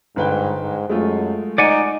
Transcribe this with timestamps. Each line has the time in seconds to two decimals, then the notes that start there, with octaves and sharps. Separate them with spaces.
0.16 G1 G#2 B4 G5
0.61 G#2
0.89 F#2 G#3 A3 F4
1.58 D#4 D5 F#5 G#5